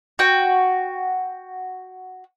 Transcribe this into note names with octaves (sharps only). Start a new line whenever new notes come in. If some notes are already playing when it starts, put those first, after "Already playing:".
F#4 G5